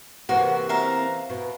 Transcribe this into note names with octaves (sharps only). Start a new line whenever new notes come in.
C3 E3 A#3 F#4
E5 F5 A#5
B2